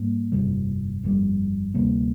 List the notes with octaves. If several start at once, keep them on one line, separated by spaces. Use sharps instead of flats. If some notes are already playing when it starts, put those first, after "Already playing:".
Already playing: G#2 G3 A#3
G1 F2 C3 G3
G1 F2 C3 G3
D2 C3 G3 A#3